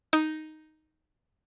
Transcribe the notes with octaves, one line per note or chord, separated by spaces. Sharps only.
D#4